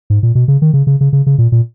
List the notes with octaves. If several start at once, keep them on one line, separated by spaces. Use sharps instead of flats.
G#2
A#2
B2
C#3
D#3
C#3
C#3
C#3
C#3
C#3
A#2
A#2